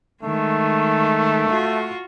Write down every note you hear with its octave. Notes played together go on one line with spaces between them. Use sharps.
D#3 G#3 A3
F4 F#4